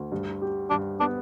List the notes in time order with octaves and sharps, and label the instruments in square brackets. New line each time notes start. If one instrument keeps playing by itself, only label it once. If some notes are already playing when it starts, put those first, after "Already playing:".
Already playing: [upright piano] D2
G2
G4
[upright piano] G2 [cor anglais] D4
[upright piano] B3 [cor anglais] D4